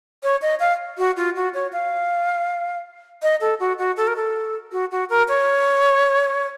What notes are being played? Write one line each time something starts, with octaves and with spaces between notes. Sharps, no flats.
C#5
D#5
F5
F#4
F4
F#4
C#5
F5
D#5
A4
F#4
F#4
A4
A#4
A4
F#4
F#4
A#4
C#5